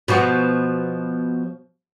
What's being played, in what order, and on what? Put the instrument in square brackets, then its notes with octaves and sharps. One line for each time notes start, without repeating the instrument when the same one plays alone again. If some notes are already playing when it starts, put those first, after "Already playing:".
[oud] B2 F3 F#4